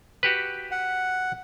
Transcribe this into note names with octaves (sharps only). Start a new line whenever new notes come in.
F#4 G4 B4
F#5